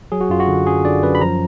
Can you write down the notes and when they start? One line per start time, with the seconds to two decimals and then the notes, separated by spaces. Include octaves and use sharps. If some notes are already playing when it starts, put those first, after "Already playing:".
0.12 F#3 G#4
0.21 F#4
0.30 F#2 F4
0.40 F#4
0.48 D3
0.66 F#2 G#4
0.85 D3 D5
1.03 F#2 B4
1.15 B5
1.21 F3 A#5